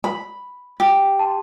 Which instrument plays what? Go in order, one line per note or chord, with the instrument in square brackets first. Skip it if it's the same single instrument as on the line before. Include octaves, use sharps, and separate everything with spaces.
[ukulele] B5
G4
[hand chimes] A5 C6